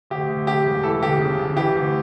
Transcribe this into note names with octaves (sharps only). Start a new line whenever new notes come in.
D2 G4
D2
D3 G4
E1
E3 A4
G1 G4
C#3
G1
E3 G4
D2